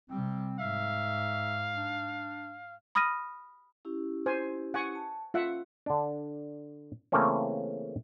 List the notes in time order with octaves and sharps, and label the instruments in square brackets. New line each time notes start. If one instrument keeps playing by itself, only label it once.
[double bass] C3 G3 [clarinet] C4
[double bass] G#2 [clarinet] E5 [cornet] F5
[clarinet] D4
[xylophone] B5 D#6 F6 A#6 D#7
[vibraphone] C#4 E4 G4
[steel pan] C5 G#5
F#5 G#5 C#6
[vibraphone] A5
[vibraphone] C#4 [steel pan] F4 E5 F#5
[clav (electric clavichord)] D3 D4
C#3 E3 A3 A#3 C4 C#4